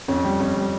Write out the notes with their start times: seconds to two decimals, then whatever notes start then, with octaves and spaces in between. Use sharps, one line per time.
0.08 F2 C#4
0.24 G3
0.40 F2 C#4
0.56 G3